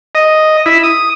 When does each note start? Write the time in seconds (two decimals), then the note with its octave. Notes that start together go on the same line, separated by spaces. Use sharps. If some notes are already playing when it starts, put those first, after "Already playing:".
0.15 D#5
0.66 E4
0.83 D#6